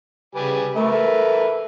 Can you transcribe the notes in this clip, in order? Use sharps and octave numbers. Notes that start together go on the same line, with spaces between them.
C#3 G3 B4 G#5
A3 A#4 B4 E5
A4